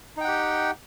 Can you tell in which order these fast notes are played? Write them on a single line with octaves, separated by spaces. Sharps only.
D#4 G5 F#5 G4